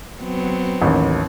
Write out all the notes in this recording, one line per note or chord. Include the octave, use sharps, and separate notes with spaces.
F#3 B3 C4
A1 D#2